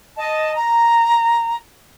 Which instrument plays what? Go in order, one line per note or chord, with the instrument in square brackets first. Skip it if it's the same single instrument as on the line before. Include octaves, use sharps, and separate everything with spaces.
[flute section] D#5 A5
A#5